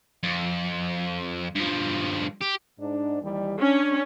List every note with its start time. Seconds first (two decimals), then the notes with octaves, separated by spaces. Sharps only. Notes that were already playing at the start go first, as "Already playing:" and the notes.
0.23 F2
1.56 G2 F3
2.41 G4
2.79 G#2 D4
3.22 D#2 E3 G3
3.60 C#4 D4